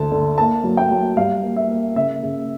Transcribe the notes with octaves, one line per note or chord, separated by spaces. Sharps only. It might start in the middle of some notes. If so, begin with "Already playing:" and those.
Already playing: D2 D3 A5
D3
A#3 A5
F#3
G5
F#3
G3 F5
A#3
E5
A#3
C#3 E5
C#3